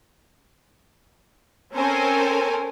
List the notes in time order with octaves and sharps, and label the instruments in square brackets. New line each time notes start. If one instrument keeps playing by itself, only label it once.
[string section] C4 C#4 A4 A#4 C5 G#5